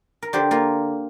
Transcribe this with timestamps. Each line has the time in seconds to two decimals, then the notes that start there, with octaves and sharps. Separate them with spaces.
0.22 A#4
0.33 D3 G4 C5
0.51 A#3 F4 A#4